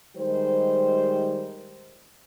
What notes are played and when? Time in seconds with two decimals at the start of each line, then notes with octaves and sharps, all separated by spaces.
0.16 D#3 G3 G#3 C5